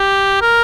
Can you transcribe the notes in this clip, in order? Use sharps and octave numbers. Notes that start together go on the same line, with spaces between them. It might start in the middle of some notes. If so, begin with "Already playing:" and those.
Already playing: G4
A#4